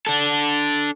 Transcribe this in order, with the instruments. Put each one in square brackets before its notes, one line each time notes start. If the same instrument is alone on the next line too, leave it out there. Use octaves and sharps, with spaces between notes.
[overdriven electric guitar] D4 A4